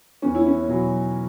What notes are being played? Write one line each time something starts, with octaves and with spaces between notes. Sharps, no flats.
E2 C#4
E4
C#4
B2 F#3